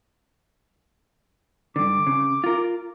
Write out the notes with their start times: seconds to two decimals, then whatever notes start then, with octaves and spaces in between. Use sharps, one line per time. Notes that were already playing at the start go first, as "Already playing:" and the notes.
1.76 G2 D3 D6
2.07 C#3
2.44 F4 A#4